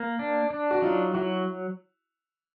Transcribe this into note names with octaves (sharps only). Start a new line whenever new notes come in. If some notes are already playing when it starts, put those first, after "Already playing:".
Already playing: A#3
D4
D4
F#4
F#3 D#4 F4
F#3 E4 F#4